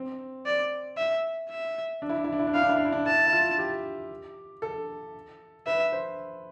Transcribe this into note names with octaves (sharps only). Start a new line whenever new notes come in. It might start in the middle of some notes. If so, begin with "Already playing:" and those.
Already playing: C4
D5
E5
E5
D4
E4
D4
E4
D4
E4
D4
E4 F5
D4
E4
D4
E4
D4
E4 A5
E4
F4
G4
A4
B4 E5
C5